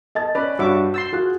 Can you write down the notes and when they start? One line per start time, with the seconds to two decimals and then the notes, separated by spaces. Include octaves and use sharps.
0.15 D#5 A5 A6
0.35 C#4 B4 D5
0.59 G2 D4 F#4 C#5 E5 D6
0.94 C6 E6 G6 A6 C7
1.13 F4 F#4 G#4 F#6